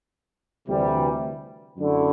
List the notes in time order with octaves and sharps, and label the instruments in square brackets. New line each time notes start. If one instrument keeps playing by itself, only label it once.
[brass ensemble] D2 C3 E3 G3
F#2 D3 A3 E4